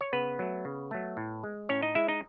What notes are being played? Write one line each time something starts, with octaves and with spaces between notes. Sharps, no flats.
C#5
C#3 B3 B4
F#3 A3
C#3
F#3 A3
A2
G#3
A2 C#4 C#5
D#4 D#5
G#3 E4 E5
D#4 D#5